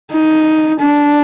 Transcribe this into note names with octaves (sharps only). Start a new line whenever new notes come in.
D#4
D4